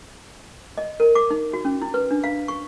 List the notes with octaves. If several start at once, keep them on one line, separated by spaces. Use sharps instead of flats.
D#5
A#4
D6
D#4
F#4
C#4
E4
B4
D4
F5
C#6